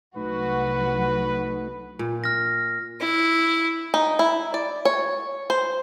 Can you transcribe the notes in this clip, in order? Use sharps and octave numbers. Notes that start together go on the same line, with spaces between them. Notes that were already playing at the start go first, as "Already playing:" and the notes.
C2 F#3 A3 D#4 F#4 B4
A#2
F6 A#6
E4
D#4
E4
D5
C#5
C5